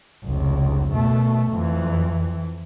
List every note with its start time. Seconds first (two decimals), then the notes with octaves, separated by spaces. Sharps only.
0.25 F1 C#2
0.94 B2 A3
1.50 F2 E3